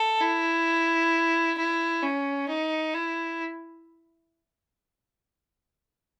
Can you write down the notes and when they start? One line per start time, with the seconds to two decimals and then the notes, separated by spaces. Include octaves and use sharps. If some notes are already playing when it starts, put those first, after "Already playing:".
Already playing: A4
0.21 E4
1.58 E4
2.03 C#4
2.49 D#4
2.94 E4